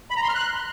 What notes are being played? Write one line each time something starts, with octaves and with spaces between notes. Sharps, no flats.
B5
A#5
C6
F6
F#6